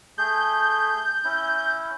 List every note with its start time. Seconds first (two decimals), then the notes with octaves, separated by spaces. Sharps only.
0.18 A3 G#4 G6
1.25 C#4 E4